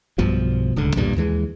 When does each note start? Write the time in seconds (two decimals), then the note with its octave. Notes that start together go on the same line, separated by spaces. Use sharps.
0.18 B1 G2 B2 F3
0.76 D1 C#2 D3
0.96 B1 E2 G2 A#2
1.16 D#2 E3 G#3